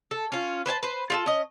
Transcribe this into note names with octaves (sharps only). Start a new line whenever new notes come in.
A4
C#4 F4
B4 C5 G#5 A5
B4 C5
F4 G4 A4
C#4 D#5